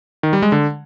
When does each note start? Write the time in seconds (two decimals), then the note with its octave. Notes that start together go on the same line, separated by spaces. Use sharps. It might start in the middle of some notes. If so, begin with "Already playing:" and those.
0.23 D#3
0.33 G3
0.42 G#3
0.52 D3